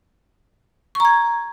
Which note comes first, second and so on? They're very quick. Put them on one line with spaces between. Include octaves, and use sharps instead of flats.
C#6 A#5 G#6